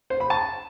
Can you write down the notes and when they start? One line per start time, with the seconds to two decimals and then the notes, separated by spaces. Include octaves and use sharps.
0.10 C5
0.20 B5
0.30 A5